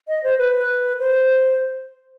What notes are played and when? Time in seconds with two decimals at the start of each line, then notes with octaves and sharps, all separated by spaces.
0.08 D#5
0.24 C5
0.38 B4
1.00 C5